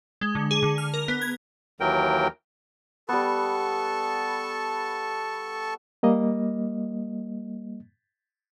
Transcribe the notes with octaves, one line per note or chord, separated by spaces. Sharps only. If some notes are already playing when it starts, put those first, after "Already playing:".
G#3
D3
G#4
D3
F6
A#4
B3
G#6
D#2 E3 F#3 A#4 G5
G3 B3 A4 A5 C#6
G3 A#3 D#5